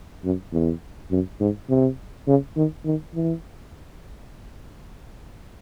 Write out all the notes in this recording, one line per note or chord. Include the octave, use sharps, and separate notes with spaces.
F#2
E2
F#2
G#2
C3
C#3
D#3
D#3
E3